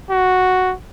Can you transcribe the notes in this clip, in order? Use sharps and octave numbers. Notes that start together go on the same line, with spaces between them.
F#4